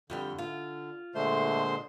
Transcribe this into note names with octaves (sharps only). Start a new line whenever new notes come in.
F2 D3 G3 G5
F4
A#2 D3 G#3 A3 C5 C6